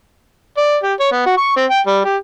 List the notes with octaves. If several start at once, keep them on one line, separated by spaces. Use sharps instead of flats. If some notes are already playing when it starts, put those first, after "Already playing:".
D5
G4
C#5
B3
F#4
C#6
C4
G5
G3
G4